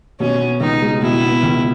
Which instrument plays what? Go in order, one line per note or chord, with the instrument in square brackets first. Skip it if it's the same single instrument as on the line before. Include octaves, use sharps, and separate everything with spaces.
[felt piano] B2 [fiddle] C#4
[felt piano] B3
[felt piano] C#2 [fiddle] D#4
[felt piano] G#3
[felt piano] B2 [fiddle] E4
[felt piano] B3
C#2